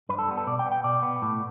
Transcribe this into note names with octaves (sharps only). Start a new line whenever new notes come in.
G2 B4
A4
G3 B3
A4
B2 D5
G5
B3
G5
B2 D5
B3
A2